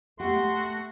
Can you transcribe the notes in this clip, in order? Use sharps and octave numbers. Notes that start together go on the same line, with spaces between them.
A3 F#4 G4 F#5 C6